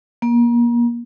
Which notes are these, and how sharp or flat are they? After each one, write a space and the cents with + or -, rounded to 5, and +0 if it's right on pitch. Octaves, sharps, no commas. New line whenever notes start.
A#3 +30